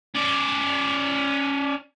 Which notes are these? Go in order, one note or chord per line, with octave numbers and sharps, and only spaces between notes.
C#4 D5